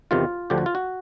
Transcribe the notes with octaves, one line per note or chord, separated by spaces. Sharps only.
E2 C3 D#3 F4
D2 D3 F3 G4
F#4
F4
F#4